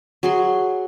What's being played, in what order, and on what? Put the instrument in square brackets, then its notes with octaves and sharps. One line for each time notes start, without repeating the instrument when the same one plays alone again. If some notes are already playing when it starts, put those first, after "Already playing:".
[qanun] F#3 G#4 C6